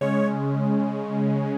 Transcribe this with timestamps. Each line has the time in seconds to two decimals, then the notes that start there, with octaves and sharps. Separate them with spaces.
0.01 C#3 G#3 C#4 C#5